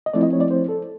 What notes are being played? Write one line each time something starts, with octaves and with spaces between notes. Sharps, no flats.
D#5
F3 A3 C4 E4 D5
D#5
C#5
D5
C5
A4